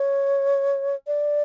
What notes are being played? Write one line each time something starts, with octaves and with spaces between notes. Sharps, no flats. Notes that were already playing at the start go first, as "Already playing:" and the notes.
Already playing: C#5
D5